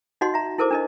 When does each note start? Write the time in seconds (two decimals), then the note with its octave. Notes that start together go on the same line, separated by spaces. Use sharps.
0.21 D#4 F#4 C#5 D#5 F#5 C6
0.34 E5 A#5
0.58 E4 A4 A#4 C5 D6
0.71 D4 A#4 D#5